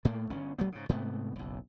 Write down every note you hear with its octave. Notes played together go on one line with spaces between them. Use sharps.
A2 A3 A#3
G1 C#4
A#1 F#3 A3 B3
G#2 C#3
G#2 C3 A3 B3
F#1 B1